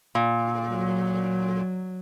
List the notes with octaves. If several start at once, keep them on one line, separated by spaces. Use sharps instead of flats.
A#2
F#3